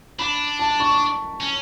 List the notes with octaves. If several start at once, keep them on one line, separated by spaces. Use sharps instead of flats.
D4 B5
A5
C#6
C#4